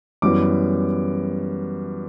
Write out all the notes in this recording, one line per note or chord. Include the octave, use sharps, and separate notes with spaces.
F#2 E3 G3 B3 D6